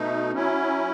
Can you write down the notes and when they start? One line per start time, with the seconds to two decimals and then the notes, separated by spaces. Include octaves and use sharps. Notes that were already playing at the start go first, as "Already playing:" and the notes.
Already playing: B2 A3 D#4
0.31 F#3 C#4 E4